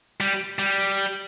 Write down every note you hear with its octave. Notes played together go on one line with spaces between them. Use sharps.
G3
G3